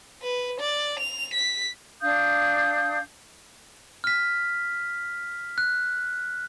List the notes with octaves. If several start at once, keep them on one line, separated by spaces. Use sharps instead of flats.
B4
D5
F7
B6
D4 F5 D#6 G6
F6 B6
F#6